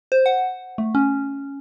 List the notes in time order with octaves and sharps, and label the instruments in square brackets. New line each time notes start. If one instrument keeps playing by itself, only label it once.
[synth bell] C5
F#5
A3
C#4